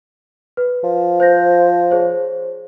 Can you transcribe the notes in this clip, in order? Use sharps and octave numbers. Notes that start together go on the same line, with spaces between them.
B4
F3
C5 G6 A#6
G#4 C5 C#5